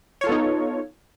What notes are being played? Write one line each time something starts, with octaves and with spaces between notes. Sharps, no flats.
B3 D#4 F4 A4 C#5